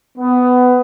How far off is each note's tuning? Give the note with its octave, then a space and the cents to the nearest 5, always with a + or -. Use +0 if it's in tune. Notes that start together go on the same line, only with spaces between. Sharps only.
B3 +15